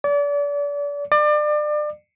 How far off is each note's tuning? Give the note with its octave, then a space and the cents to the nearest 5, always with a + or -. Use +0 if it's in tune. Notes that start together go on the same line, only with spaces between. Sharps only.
D5 -35
D5 +30